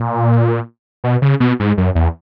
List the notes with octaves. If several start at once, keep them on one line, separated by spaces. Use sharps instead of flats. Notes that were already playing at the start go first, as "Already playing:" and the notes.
Already playing: A#2
B2
C#3
B2
G#2
F#2
E2